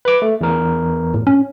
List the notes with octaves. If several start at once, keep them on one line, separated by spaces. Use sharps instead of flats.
B4 D6
A3
E2 A#4
A2
C#4